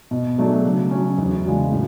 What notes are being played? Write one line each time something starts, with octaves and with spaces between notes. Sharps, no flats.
B2
F#3 A3 D4 G#4
C#3
F#3 C#4
E2
C#3 G#3 D4 F#4
A2